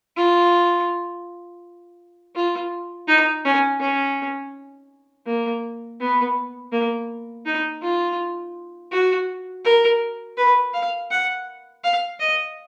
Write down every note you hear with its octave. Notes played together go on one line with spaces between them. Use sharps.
F4
F4
D#4
C#4
C#4
A#3
B3
A#3
D#4
F4
F#4
A#4
B4
F5
F#5
F5
D#5